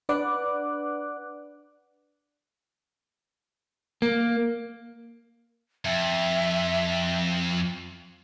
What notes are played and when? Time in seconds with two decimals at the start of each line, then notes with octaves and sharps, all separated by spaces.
0.09 D4 B4 D5 F#5 D6 F#6
4.02 A#3
5.85 F2 E5